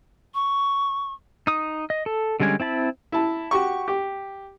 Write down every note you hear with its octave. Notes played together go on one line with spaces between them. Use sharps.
C#6
D#4 D#6
D#5
A4
D3 G3 G#3 C#4 G#5
C4 E4 A5 B5
E4 A5
F#4 G4 C#6
G4